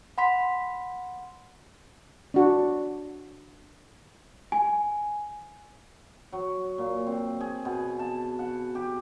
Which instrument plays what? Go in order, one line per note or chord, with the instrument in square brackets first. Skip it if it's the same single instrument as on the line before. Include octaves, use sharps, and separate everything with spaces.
[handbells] F#5 B5 C6 B6
[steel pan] D4 F#4
[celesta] G#5
[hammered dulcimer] F#3
A#2
C4
G#4
B2
A5
F#5
G4